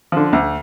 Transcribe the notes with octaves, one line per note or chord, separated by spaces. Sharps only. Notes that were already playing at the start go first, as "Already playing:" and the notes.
D3 F3
D2